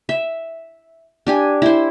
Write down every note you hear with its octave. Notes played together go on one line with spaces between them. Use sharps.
E5
D4 G4 G#5
E4 C5